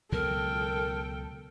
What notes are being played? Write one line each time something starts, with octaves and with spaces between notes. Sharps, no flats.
C#2 B2 F#3 A4 A#4 G5